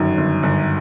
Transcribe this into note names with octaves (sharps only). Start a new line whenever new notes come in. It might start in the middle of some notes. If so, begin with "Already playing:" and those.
Already playing: G1 F#2 D#3
G1
G1